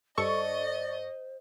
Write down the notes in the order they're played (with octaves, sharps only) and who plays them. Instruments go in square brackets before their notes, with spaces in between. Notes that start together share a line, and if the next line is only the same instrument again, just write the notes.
[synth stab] G2 A4 C#6 [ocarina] C5 [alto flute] D5 [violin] D#5